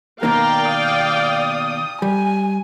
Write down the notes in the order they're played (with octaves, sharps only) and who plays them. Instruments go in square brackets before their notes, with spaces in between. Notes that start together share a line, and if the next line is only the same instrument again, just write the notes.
[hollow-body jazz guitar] B2 D#3 A#3 [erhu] A#4 [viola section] D5 F5 G5
[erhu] D#6
[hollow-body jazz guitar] G3 [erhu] G#5